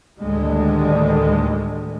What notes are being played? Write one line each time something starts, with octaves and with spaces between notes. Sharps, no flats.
D2 A2 D3 D#3 G3 G#3